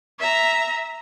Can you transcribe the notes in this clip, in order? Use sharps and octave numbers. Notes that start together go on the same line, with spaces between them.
E5 A#5